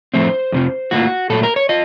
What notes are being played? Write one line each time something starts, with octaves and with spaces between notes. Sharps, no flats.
A2 F3 A3 C4 C5
F2 C3 F3
A2 F3 A#3 F4 F#4
A#2 F#3 A3 A4
A#4
C#5
F4 D#5